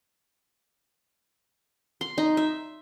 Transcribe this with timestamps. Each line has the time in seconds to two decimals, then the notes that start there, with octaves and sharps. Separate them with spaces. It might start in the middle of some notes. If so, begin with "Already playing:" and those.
2.01 C6
2.18 D#4
2.37 E5